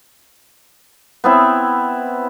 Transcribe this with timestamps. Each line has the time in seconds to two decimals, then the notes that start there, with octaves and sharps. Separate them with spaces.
1.24 B3 C4 E4